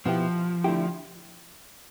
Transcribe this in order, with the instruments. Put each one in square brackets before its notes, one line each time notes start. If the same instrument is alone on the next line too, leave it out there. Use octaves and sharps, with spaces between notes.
[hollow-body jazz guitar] B2 B3 E4 G4 [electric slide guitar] F3
[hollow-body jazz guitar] D3 A3 E4 G4